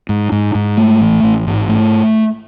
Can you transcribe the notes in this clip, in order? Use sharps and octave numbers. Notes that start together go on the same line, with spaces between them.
G#2
G#2
G#2
A3
A1
A1
G#2
A3